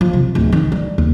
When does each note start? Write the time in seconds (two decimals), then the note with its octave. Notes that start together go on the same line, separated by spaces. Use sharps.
0.01 F3
0.13 C3
0.35 D1
0.52 D#3
0.72 G3
0.98 D#2